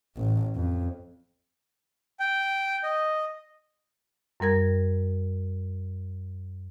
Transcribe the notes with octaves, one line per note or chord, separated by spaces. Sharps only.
A1
F2
G5
D#5
F#2 G3 A#4 G#6